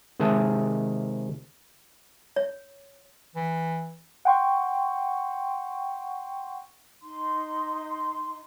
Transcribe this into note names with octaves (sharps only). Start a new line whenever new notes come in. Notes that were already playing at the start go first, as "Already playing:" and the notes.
C3 D#3 G#3 G#4 E5 A5
C#5
E3
F#5 G5 C6 C#6
D#4 C6